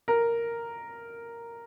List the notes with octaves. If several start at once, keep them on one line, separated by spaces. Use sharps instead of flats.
A#4